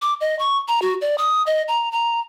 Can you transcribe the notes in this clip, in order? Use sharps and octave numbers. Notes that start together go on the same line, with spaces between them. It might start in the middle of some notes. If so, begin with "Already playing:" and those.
D6
D#5
C#6
A#5
F#4
D5
D#6
D#5
A#5
A#5